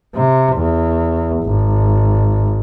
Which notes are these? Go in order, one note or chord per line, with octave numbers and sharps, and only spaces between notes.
C3
E2
G#1